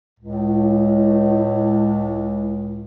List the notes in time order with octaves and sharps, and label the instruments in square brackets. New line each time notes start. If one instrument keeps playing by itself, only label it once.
[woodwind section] C#2 A2